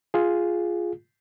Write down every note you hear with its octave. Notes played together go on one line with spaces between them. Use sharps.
F4 G#4